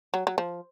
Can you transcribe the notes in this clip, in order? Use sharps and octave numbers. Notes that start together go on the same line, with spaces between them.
F#3
F#3
F3